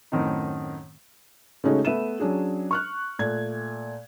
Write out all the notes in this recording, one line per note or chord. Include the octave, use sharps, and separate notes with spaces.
F#2 A2 D#3 C4 D#4
C#3 G#3 A3 C#4 D#4 F#4
A3 B3 E5 D#7 E7
F#3 C#4 D4 G#4
C#6 F6 F#6
A#2 A3 G#6